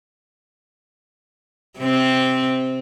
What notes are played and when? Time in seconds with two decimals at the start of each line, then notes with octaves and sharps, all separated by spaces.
1.79 C3 C4